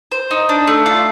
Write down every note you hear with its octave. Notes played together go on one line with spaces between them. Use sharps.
C5
D#4
D4
A3
F4